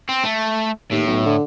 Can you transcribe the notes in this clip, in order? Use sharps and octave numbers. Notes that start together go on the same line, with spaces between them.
C4
A3
D#2 A2
B1
D3